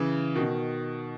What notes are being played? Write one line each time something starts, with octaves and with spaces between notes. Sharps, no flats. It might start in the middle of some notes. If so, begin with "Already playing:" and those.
Already playing: C#3 E3
B2 D#3